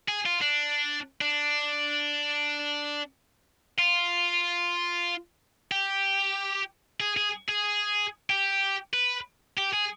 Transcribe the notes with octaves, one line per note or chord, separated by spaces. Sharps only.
G#4
F4
D4
D4
F4
G4
G#4
G#4
G#4
G4
B4
G4
G#4